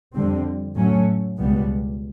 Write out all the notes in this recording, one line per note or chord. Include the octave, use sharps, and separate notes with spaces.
F2 D3 G3 C4
A2 F#3 A3 C#4
C#2 B2 G3 B3